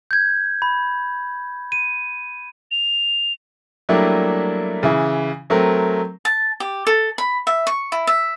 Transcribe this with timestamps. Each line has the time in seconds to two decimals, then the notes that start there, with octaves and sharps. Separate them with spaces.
0.11 G6 G#6
0.62 B5
1.72 D#7
2.71 F7
3.89 F#3 G3 A3 A#3 D4 E4
4.83 C#3 E3 E4
5.50 F#3 A3 C4 A#4
6.25 A5
6.60 G4
6.87 A4
7.18 B5
7.47 E5
7.67 C#6
7.92 E4
8.07 E5